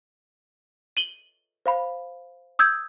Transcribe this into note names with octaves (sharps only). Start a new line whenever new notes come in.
D#7 F#7 G7
C5 F5 B5
D#6 E6 G6 G#6